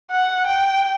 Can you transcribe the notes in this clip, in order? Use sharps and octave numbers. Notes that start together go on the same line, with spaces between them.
F#5
G5